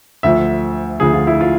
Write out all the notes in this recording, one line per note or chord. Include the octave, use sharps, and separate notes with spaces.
D2 D3 F3 E5
D2 D3 F3 G#4
F4
E4
F4